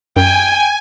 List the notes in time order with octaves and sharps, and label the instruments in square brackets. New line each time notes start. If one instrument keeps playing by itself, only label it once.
[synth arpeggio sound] F#2 [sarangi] G5 [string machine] G#5